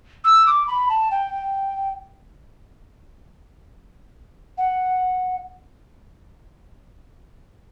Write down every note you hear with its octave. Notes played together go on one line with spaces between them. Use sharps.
E6
D6
B5
A5
G5
F#5